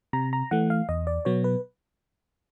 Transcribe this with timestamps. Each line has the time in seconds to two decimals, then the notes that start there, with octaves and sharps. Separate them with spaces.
0.13 C3 A#5
0.33 A#5
0.51 E3 A3 F#5
0.70 F5
0.89 E2 D#5
1.07 D5
1.25 B2 F#3 B3 C#5
1.44 B4